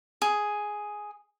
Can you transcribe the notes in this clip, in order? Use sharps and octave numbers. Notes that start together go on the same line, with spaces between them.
G#4